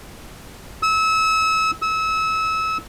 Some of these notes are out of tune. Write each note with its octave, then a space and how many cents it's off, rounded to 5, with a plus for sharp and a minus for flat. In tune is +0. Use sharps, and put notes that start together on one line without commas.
E6 -30
E6 -30